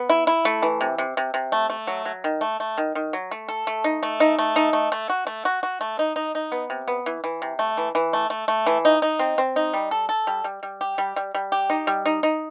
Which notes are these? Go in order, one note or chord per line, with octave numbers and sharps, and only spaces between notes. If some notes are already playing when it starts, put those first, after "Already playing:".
Already playing: B3
E4
E4
A3
E3
C3
C3
C3
C3
A3
A3
F#3
F#3
D#3
A3
A3
D#3
D#3
F#3
A3
A4
A3
D#4
A3
D#4
A3
D#4
A3
A3
F#4
A3
F#4
F#4
A3
D#4
D#4
D#4
B3
C3
B3
E3
E3
C3
A3
E3
E3
A3
A3
A3
E3
D#4
D#4
C4
C4
D#4
G3
A4
A4
G3
G3
G3
G4
G3
G3
G3
G4
D#4
G3
D#4
D#4